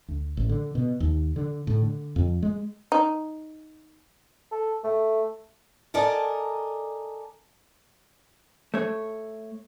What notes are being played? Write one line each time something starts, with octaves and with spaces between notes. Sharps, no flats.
D2
A1
D3
B2
D#2
D3
A2
D3
F2
G#3
D#4
A4
A3
A4 A#4 D5 D#5 G#5 A5
A3 C#5